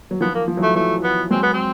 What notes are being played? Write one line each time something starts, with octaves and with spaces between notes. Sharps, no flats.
F#3
D#3 F3 B3
A#3
F3
E3 F#3
A3
E3 F#3 A3
B3
F#3 G#3 C4
B3
C4